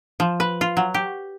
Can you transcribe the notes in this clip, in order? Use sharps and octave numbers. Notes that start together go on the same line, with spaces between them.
F3
B4
F4
F#3
G4